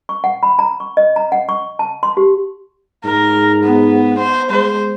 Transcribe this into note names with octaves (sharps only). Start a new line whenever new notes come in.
C#6
F#5
B5
A#5
C#6
D#5
A#5
F#5
C#6
A5
C6
G4
G#2 A#4
B3
C5
G#3 C5